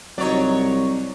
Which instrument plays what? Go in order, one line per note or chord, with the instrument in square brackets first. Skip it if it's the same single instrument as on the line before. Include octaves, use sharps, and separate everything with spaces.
[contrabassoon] C2 [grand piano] F#3 D#4 [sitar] C#5 D5